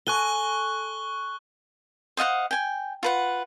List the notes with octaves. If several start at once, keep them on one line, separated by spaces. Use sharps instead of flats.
A4 G#5 C#6 F#6 G7
C5 D#5 F5 F#5
G5 G#5
F4 B4 F#5